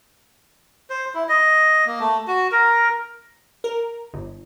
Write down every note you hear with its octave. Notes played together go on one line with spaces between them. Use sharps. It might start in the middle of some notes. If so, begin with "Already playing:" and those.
C5
E4
D#5
A#3
A3
F#4
A#4
A#4
G1